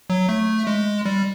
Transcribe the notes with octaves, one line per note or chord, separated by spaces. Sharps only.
F#3
A3
G#3
G3